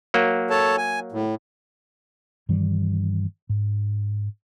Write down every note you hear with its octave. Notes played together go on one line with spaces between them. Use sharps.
F#3 A#3
A4 C#5 A5
G#5
A2
G2 D#3 E3 G3
G#2